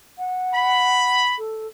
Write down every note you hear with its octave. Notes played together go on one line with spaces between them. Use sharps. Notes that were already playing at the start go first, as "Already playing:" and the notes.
F#5
B5
A4